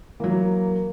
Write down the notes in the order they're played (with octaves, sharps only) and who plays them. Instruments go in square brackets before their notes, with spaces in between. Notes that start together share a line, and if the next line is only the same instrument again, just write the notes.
[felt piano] E3 F#3 [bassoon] A#3